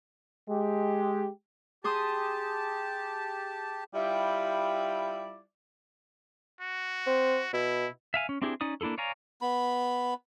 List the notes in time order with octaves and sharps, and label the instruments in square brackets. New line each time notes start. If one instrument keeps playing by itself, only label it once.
[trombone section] G#3 G4
[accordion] G4 A5 [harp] G#4 C6 D#6
[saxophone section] G3 E4 F4 G4 D5
[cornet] F#4
[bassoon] C4
[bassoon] B2 [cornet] E4
[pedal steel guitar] E5 F5 G#5
C#4
C4 D4 E4 G4 G#4
C#4 D#4 D5 D#6
A#3 D4 E4 G#4 A4
C#5 D5 F5 G#5 A#5
[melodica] B3 B5